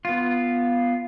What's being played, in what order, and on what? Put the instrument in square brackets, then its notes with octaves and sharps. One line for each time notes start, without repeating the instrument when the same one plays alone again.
[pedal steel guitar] B3 F4